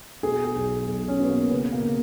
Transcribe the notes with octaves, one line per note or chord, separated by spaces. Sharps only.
B2 G#4
G#4
B1
B1
C#4
B2 B3
A#3
C#3 B3
A#3
C#3